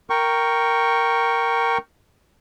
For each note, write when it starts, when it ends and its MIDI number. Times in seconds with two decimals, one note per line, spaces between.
0.10 1.78 70
0.10 1.78 79
0.10 1.78 85